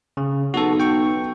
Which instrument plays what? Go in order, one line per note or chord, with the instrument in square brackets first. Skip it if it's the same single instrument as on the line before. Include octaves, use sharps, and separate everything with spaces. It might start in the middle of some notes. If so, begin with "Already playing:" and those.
[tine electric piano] C#3
[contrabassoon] B1 [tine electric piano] F#4 A4
[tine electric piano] G5 C#6